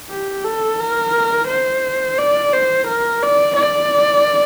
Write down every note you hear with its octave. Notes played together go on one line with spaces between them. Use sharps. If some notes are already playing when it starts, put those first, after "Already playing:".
G4
A4
A#4
C5
D5
C5
A#4
D5
D5